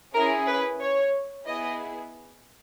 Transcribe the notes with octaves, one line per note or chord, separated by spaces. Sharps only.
C#4 E4 G#4 A#4
B4
C#5
B3 E4 G#4 D#5